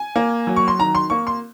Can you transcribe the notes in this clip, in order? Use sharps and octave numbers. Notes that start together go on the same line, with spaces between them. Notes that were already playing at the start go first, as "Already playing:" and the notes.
Already playing: G#5
A#3
F#3
C#6
C6
D#3 A#5
C6
A#3 C#6
C6